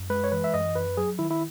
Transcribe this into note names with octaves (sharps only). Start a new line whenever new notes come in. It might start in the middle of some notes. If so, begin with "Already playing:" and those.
Already playing: F#2
G#3 B4
C#5
E3 B4
E5
F#2 D#5
F#2 B4
F#3 G#4
D#3 E4
E4